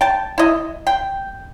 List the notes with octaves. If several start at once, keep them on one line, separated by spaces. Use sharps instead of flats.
G5 A5
E4 D#5
G5